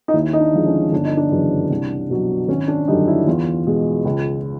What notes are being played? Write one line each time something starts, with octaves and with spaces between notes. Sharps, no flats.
D#4
D#2 E4
D#4
D4
D3 F3 G#3
C#4
G1 D4
D#4
D4
F#2 C#3 E3
C2
B2 F#3
G#1 C#4
D4
F#2 D3 G3 D#4
E4
E2 F4
B2 G#3
C#2